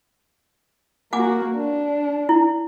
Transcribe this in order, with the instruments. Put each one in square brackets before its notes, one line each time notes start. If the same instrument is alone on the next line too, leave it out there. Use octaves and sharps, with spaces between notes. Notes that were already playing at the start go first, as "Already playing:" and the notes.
[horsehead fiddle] A#3 F#4 [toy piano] F#5 G#5 D6
[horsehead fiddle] D4
[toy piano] E4